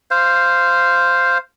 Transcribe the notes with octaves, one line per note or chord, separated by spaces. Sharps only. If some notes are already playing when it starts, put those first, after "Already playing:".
C5 F5